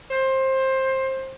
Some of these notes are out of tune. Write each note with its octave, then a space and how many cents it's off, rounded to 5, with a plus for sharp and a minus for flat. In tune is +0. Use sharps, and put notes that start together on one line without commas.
C5 +20